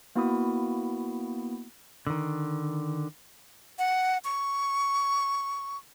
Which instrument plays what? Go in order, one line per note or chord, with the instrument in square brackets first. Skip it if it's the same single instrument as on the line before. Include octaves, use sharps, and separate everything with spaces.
[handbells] A#3 B3 E4 F#4 B5 D#6
[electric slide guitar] D3 D#3
[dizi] F#5
C#6